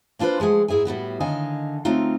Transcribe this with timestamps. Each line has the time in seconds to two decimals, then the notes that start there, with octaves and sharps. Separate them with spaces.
0.19 A#3 D4 F4 G#4 B4 C5
0.40 F3 G#3 A3 G#4 F#5
0.68 G#2 E4 G#4 E5 G#5
0.85 A2 G3 B3 F#4
1.20 D3 D#3 D#5 F5 G#5
1.85 F#3 A3 C4 D#4 F4